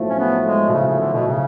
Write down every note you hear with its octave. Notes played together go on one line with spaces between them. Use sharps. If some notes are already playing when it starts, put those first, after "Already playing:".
Already playing: B1 A2 F3 A3
C#4
B3
G#3
B2
C#3
C#3
D3
B2
C#3